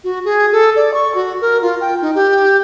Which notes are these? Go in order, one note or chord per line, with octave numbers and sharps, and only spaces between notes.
F#4
G#4
A4
D5
C#6
F#4
A#4
F4
G5
D#4
G4